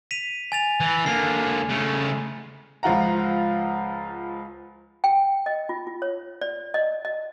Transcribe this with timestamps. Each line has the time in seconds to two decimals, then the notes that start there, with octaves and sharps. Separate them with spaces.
0.11 B6 D#7 F7
0.52 G#5 A6 F7
0.81 E3
1.06 D3 A#3 C7
1.69 C#3 A3
2.83 C#2 F3 F4 F#5 A#5
5.04 G5
5.46 D#5
5.69 F4
5.87 F4
6.02 C#5
6.41 D5
6.74 D#5
7.05 D#5